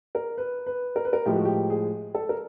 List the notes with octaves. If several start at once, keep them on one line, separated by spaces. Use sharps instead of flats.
A#4
B4
B4
A#4
B4
A#4
A2 F3 G#3 G4
F#4
G4
G#4
A4
A#4